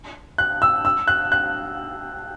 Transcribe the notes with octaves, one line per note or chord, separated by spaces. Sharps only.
F#6
E6
E6
F#6
F#6